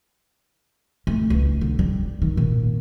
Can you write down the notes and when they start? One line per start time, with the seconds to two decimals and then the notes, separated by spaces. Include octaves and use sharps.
1.07 A3
1.30 C#2
1.61 D3
1.79 G3
2.22 D#3
2.37 A#2